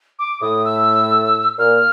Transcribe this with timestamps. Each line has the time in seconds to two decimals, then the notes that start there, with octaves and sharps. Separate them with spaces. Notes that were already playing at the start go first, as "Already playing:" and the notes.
0.19 D6
0.42 A2 D#6
0.65 E6
1.59 A#2 F6